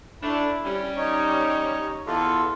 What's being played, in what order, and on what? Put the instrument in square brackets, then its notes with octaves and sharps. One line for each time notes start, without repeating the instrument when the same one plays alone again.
[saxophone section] A3 D4 [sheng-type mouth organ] E4
[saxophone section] G3 C#4
[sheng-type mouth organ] D#4 C#5
[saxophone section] E2 B3 [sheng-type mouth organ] F4 A4